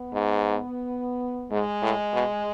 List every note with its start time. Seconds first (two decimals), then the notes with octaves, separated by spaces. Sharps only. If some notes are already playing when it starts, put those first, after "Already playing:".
Already playing: B3
0.14 G#2
1.51 G#2 G#3
1.82 A2
2.13 B2